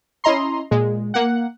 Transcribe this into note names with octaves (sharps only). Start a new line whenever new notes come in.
C#4 E4 D#5 A#5 C6
A#2 G#3
A#3 F#5